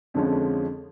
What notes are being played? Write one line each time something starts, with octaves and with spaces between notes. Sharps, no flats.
F2 D3 F3 G#3 C#4